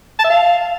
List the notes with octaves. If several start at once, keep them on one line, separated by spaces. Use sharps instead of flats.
A5
E5
F5